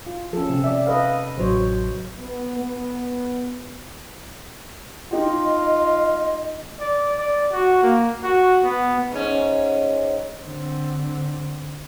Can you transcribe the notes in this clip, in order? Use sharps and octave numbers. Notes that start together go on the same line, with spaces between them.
F4
F3 C#4 A4
C3 C4 C#4
D5 E5
A4 B4 D#5 F5
A1 F#3 C5 C#5
B3
B3
D#4 F4 G4 D#5
D5
D5
F#4
A#3
F#4
B3
G#2 A3 C#4
D3 C4